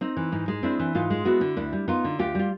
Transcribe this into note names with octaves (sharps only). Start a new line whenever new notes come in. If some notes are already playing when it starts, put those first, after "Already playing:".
C4 D#4
E3
G#2 D#4
G#3
C4 D4 E4
E3
G#2 D#4 F4
G#3
B3 E4 F#4
D3
D2 D4 E4
G3
B3 D#4 F4
D3
D2 F4 G4
G3 F4